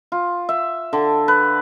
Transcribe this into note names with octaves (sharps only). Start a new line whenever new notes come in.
F4
E5
D3
B4